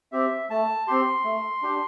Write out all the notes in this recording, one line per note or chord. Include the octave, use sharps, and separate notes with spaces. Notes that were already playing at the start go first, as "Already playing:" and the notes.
C4 G4 E5
A3 A5
C4 G4 C6
A3
D4 G4